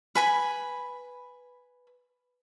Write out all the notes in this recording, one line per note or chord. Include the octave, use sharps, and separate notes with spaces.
B4 G#5 B5